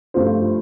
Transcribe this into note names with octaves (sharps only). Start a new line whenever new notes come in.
G2 F3 A3 F4 C5